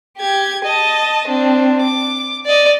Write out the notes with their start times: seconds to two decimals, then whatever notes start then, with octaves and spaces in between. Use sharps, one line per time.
0.18 G4 G#6
0.64 D#5 A5
1.28 C4 D4
1.82 D6
2.46 D5 D#5